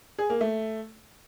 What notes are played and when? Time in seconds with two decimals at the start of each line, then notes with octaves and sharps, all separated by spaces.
0.18 G#4
0.30 A#3
0.41 A3